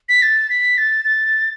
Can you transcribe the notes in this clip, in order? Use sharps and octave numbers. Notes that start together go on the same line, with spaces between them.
B6
A6
B6
A6
A6